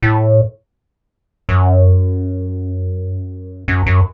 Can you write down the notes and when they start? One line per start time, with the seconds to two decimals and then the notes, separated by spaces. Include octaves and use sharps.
0.03 A2
1.49 F#2
3.68 F#2
3.86 F#2